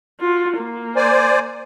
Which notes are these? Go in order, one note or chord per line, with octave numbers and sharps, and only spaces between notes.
F4 F#4
A#3
C5 D5 G#5